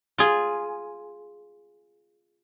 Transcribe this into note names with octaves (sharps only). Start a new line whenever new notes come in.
F4 G#4